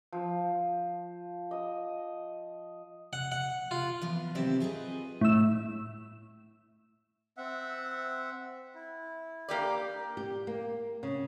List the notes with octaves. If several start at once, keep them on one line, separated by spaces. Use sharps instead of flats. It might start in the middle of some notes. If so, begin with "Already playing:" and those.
F3
D#5
F#5
F#5
F4
E3 F3 B3
C3 D#3 F#3 C4 G4 E5
F4 G#4 B4 D#5
A2 E6
C4 E5 F#5
E4
A#3 G4 D5
G4
A#3
C#3